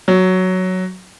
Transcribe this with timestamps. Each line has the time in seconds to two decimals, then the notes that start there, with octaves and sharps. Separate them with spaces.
0.08 F#3